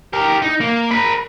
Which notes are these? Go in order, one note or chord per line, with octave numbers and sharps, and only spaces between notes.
G4 A#4
D#4
A#3
A#4 B5